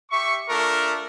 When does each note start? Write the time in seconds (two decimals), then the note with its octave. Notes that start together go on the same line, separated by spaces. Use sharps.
0.11 G4 E5 C#6
0.49 A3 D4 F4 A4 A#4